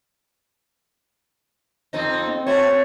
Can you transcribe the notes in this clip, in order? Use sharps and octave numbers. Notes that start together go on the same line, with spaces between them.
F2 C4 D#4
C4
A3 F#4 C#5